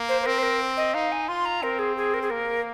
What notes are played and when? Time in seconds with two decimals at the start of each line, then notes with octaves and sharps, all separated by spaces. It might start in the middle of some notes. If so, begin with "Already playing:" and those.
Already playing: A#3
0.09 C5
0.21 C5
0.26 C4 A#4
0.38 C5
0.43 A#4
0.77 D#5
0.94 D#4 F5
1.12 G#5
1.28 F4 C6
1.45 A#5
1.62 C4 A#4
1.79 G#4
1.97 G#4
2.14 A#4
2.22 G#4
2.30 A#3 A#4